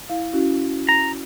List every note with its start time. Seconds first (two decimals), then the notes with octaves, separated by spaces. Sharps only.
0.09 E4 F5
0.33 C#4 E4 F#4
0.89 A#5